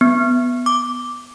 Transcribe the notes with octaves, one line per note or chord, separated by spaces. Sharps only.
B3
D6